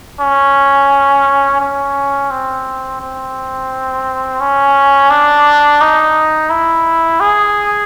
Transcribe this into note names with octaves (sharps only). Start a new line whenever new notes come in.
C#4
C#4
C4
C4
C#4
D4
D#4
E4
G#4